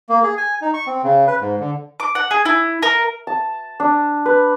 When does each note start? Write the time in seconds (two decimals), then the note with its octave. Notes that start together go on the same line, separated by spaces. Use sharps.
0.09 A#3
0.24 G#4
0.37 G#5
0.62 D#4
0.74 C#6
0.87 C4
1.04 C#3
1.28 B4
1.41 G#2
1.60 D3
2.00 D6
2.15 F#5
2.31 G#4
2.45 E4
2.83 A#4
3.27 A5
3.80 D4
4.26 B4